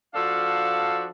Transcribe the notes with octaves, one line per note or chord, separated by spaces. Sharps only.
F3 D4 F#4 A4 F5